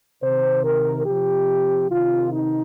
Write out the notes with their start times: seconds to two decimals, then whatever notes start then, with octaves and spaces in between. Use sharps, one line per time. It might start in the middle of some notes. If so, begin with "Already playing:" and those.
0.22 C3 D#3 C5
0.64 A#4
1.06 C3 F3 G4
1.90 C3 D#3 F4
2.32 D#4